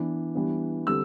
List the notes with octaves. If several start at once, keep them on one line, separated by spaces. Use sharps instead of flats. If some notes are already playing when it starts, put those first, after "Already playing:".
Already playing: E3 B3 D4
E3 G3 B3 D4
D3 G3 C4 E6